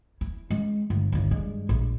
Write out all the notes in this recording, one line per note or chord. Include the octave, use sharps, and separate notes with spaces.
E4
G#3 C#4
G1
G1 D#2
G2 G#3
A#1